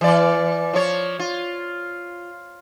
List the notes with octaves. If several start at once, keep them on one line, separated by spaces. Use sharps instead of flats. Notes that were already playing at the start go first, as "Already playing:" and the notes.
E3 D5
F3 C#5
F4